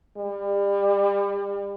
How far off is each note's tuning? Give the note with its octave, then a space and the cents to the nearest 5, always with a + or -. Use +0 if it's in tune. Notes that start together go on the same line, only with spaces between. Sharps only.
G3 +35